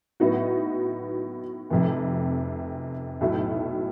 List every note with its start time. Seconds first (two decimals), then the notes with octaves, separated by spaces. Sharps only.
0.20 A2 F#3 B3 D#4 F#4
1.70 F1 F2 C3
3.21 B1 A2 F#3 A3